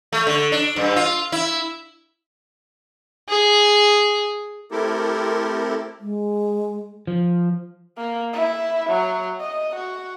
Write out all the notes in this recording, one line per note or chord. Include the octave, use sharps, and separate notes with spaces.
A3
D3
D4
G2
F4
E4
G#4
A3 C4 E4 G4 A4 A#4
G#3
F3
A#3
E4
F#3
D#5
F#4